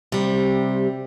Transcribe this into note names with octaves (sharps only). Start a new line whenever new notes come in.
C3 G3